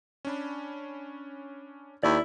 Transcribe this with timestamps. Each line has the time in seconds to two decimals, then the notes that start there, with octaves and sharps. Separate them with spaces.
0.25 C#4 D4 B5
2.03 D#2 E4 D5 E6